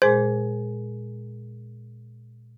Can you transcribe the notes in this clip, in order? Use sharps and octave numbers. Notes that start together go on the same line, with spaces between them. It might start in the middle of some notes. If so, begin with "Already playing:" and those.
A#2 G#3 G#4 C5